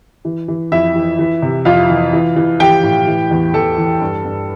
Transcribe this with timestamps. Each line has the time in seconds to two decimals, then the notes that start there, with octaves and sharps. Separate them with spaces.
0.25 E3
0.48 E3
0.72 F2 E4 E5
0.96 E3
1.19 E3
1.42 C3
1.65 F2 F4 F5
1.89 E3
2.13 E3
2.36 E3
2.60 E3 G4 G5
2.83 A2
3.07 E3
3.31 E2
3.54 E2 A4 A5
3.78 E3
4.01 G2
4.25 G2